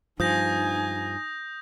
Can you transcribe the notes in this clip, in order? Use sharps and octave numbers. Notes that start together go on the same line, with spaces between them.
G2 F3 D#4 G#5 D#6 G6 A#6